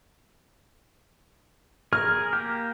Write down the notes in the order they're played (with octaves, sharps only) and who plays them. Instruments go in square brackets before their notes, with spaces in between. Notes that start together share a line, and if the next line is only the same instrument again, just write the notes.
[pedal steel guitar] G#4 A#4 [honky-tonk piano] F6
[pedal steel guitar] A#3 G4